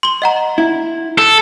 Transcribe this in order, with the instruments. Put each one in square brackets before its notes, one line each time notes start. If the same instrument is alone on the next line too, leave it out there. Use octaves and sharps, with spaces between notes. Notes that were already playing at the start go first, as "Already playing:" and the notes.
[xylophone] C6 G7
D#5 F#5 A#5
[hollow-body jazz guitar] E4
[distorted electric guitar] A4